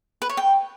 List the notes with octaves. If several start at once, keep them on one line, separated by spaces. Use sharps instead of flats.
B4
C#5
G5